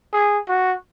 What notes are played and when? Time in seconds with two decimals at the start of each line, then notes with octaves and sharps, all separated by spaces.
0.13 G#4
0.49 F#4